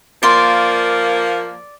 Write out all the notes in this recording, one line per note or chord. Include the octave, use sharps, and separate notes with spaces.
F3 A#3 D5 C6